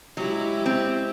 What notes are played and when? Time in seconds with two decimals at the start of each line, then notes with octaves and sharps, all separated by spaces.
0.17 F#3 G#3 E4 G4
0.66 C4